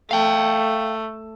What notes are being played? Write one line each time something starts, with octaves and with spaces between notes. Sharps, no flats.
A3 F5 G5